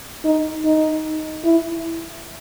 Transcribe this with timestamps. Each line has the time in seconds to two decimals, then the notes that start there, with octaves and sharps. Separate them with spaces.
0.25 D#4
0.65 D#4
1.45 E4